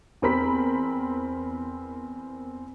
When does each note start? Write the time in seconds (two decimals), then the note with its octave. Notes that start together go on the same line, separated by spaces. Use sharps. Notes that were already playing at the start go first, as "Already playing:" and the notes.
0.22 E2 C4 A#4 B5 B6